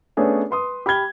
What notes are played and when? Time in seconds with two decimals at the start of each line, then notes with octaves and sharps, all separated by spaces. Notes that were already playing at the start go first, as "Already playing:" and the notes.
0.17 A3 B3 C#4 D4 G#4 C#5
0.51 B4 C6 D#6
0.86 G4 B5 F6 G#6 G7